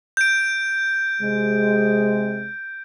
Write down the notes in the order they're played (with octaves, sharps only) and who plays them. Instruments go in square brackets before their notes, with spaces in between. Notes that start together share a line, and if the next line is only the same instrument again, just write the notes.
[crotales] G6 D7
[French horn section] C3 G#3